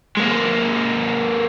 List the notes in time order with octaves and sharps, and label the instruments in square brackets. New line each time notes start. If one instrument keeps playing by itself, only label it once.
[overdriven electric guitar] G#3 A#3